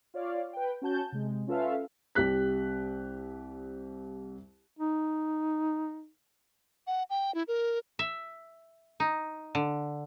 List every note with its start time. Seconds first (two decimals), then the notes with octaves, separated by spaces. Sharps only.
0.14 F4 C#5 D5 F5
0.53 B4 G5
0.82 C#4 F#4 A5 G6
1.12 C3 G#3
1.47 C#4 F4 A4 B4 E5 F5
2.15 C2 G4 F#6 B6
4.79 D#4
6.87 F#5
7.10 G5
7.35 E4
7.48 A#4
7.99 E5
9.00 D#4
9.55 D3